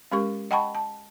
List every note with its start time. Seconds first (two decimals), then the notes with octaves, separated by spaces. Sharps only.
0.12 G#3 C#4 G4 A#4 C#6
0.51 D#5 F#5 G5 A5 B5 C#6
0.75 A5